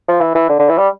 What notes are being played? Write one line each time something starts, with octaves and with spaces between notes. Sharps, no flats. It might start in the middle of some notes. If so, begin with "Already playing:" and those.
F3
E3
E3
D3
D3
E3
G3